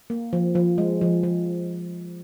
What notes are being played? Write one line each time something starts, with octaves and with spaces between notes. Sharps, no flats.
A#3
F3
F3
G#3
F3
F3